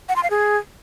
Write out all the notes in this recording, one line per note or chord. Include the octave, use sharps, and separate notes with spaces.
F#5
C6
F5
G#4